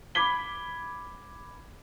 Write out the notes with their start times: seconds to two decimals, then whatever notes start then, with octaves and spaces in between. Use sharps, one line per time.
0.15 B5 D6 G#6 B6 G7